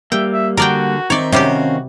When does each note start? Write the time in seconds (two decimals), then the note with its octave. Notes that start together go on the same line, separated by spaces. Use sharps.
0.12 G3 A#3 E5 G5
0.33 E5
0.57 D3 F#4 A#4 D5 G5
1.10 D#3 C4 D#4 C#5 D5 E5
1.32 C3 G3 C#4 F#4 G4 F5